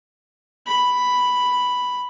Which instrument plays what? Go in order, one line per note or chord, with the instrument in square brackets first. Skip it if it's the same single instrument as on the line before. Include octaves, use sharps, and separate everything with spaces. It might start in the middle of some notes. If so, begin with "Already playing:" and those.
[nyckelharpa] B5